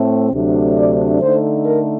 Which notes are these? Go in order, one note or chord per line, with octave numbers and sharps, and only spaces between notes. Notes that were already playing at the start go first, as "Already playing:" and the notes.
Already playing: A2 A3 C4
D2 C3 F#3 A3 D4
D5
D3 A3 D#4 C5
A#4